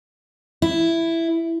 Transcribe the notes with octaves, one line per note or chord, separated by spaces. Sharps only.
E4